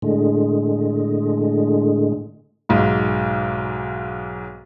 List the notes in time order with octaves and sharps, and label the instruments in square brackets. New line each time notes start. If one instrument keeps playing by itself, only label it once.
[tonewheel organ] A2 D3 G#3
[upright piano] B1 G#2